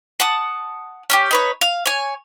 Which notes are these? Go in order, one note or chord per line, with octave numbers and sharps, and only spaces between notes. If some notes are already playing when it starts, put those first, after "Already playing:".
F#5 A5 D#6
C#4 D4 G4
D#4 B4 C#5
F5
C#5 G#5